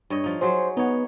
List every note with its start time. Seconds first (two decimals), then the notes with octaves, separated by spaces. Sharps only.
0.10 G2 C#5 D#5
0.24 F3 D#4
0.41 F#3 F#4 G#4 C5
0.77 B3 D#4 C#5